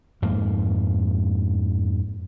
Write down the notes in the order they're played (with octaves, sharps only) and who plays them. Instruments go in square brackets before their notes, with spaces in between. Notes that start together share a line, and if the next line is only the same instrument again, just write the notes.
[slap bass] F2 G#2 A#3